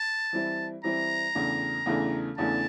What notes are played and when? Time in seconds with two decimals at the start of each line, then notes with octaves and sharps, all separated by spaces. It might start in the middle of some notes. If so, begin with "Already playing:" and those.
Already playing: A5
0.33 E3 G3 C4 E4
0.84 E3 G3 C4 E4 A#5
1.35 E2 C#3 E3 A3 D4
1.86 E2 C#3 E3 A3 D4
2.38 E2 C#3 E3 A3 D4 A5